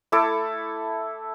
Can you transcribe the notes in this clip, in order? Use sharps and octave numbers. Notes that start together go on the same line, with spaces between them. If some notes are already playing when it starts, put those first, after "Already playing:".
A3 E4 A4 D6